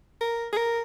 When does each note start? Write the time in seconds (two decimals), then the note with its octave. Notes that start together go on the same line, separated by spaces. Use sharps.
0.21 A#4
0.52 G#4
0.57 A#4